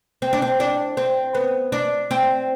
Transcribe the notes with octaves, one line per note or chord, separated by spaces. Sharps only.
C4
D4
C4
D4
C4
B3
D4
C4